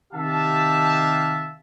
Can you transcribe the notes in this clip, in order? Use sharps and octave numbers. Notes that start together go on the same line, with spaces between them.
C3 D#3 G4 E5 F5 A5